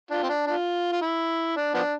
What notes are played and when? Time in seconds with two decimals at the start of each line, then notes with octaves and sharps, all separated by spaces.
0.11 D4 F4
0.23 C4
0.29 D4
0.47 D4 F4
0.92 F4
1.02 E4
1.57 D4
1.74 F3 B3 D4